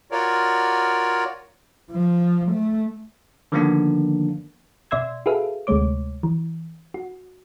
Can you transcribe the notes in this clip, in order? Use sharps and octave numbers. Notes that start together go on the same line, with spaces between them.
F4 F#4 A#4 C#5 D5
F3
A3
D3 D#3 F3 A#3 B3 D4
B2 D5 E5 C6 E6 G#6
F#4 G#4 A4 B4 E5 F5
D2 C3 G#3 A3 C#5 D6
E3
F#4